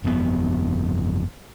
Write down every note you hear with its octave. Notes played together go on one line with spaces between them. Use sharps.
G1 F2 A2 B3